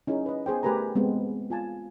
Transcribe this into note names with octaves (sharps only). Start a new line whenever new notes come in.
C#4 D#4 E4 G#4
B4 D#5
B3 G#4 C5 G5
A3 G4 A#4 B4 G#5 A#5
G#3 B3 C4
F4 G#5 A5